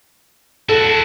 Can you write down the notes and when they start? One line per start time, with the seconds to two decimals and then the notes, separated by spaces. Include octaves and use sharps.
0.69 E4 F#4 A4